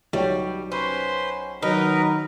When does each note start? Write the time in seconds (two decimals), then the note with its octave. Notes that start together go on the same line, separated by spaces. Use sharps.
0.13 B1 G3 C#5 G5
0.72 C#4 B4 C5 C6
1.62 D#3 F#3 D#4 A#4 B4